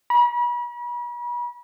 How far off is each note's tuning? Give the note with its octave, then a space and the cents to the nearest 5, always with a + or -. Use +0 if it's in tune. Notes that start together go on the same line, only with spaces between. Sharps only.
B5 -40